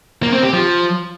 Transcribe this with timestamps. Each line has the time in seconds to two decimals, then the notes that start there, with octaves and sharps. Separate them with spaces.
0.23 A#3
0.33 C4
0.43 G4
0.53 F3